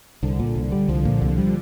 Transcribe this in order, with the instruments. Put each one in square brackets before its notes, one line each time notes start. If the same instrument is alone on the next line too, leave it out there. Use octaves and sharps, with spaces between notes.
[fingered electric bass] C2 [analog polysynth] D3
[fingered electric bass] A#2
C2
G3
[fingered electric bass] C2 [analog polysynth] F3
[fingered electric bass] A#2
C2
G3